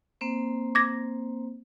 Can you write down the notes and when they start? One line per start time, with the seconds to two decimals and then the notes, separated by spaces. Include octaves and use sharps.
0.21 A#3 C4 C5
0.75 D6 G#6 A#6